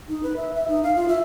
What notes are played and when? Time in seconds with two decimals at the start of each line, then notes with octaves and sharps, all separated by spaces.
0.09 D#4
0.23 B4
0.36 E5
0.55 E5
0.68 D#4
0.83 F5
0.96 F4
1.08 E5